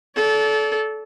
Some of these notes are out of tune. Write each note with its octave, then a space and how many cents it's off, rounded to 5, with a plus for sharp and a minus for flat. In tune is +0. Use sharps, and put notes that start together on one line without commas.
A4 -25 D5 -35